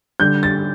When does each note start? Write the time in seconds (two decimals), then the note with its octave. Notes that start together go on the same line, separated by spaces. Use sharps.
0.20 D3 G3 G6
0.43 A6